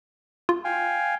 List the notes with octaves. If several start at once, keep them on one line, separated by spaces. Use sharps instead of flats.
F4
F5 G5 G#5